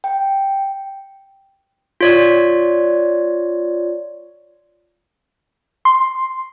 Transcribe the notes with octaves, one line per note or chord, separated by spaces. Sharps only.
G5
F4 C#5 D5
C6